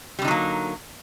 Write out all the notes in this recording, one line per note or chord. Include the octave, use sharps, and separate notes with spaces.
D3 F#3 G3 A#3 D#4